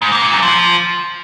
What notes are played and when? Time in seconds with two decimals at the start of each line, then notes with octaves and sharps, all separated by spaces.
0.02 G#2
0.12 A#3
0.22 A#2
0.32 F#2
0.42 F3